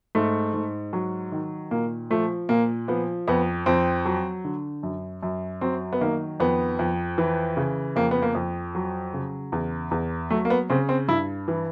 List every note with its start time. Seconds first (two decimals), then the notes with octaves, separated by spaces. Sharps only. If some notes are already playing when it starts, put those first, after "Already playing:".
0.15 G#2 A3
0.54 G#2
0.93 F#3
1.32 D#3
1.71 A#2 A#3
2.10 F3 A3
2.49 A#2 A#3
2.88 F3 B3
3.28 F2 B3
3.66 F2 C4
4.05 F#3
4.45 D3
4.83 F#2
5.23 F#2
5.61 F#3 C4
5.93 B3
6.01 D#3 A#3
6.40 F2 B3
6.79 F2
7.18 E3
7.57 C#3
7.96 F2 A#3
8.11 B3
8.22 A#3
8.35 F2
8.75 F#3
9.14 C#3
9.52 E2
9.91 E2
10.30 F#3 A3
10.45 A#3
10.50 B3
10.70 C#3 C4
10.89 C4
11.08 G2 E4
11.48 E3